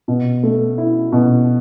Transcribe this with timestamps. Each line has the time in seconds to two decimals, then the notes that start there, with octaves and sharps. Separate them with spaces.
0.08 B2
0.43 A3
0.78 E4
1.12 B2